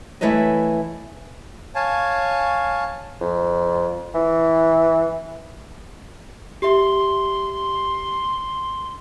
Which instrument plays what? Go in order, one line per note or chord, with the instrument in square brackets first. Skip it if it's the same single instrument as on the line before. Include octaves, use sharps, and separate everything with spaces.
[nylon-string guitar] E3 A3 E4 B4 C#5 D#5
[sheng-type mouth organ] C#5 F5 G#5 A5
[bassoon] F2
E3
[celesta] G4 E5 [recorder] C6